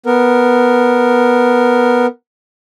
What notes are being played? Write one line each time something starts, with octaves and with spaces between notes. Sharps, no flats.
B3 A#4